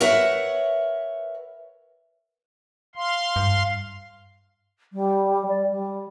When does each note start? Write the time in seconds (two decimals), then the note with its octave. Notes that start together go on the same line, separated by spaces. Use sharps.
0.01 A#4 B4 C#5 E5 F#5
2.95 F5 C6
3.36 G2
4.93 G3
5.48 D5
5.70 G3